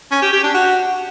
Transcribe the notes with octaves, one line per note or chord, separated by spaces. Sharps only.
C#4
G4
G4
D4
F#4